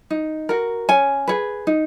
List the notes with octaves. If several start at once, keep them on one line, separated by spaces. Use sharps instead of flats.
D#4
F#4 A#4
C#4 G#5
G#4 B4
D#4